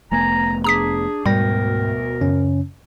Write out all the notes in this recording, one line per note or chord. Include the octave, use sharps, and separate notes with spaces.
F1 A3 B3 G#5 A#5
D4 G#4 A#5 D#6 B6
D2 G#2 B2 G3 A#4 G5 A#6
F#2 C#3 C#4